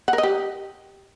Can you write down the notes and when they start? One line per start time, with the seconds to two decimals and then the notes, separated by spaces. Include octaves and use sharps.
0.08 F#5
0.13 A#4
0.18 D#5
0.23 G4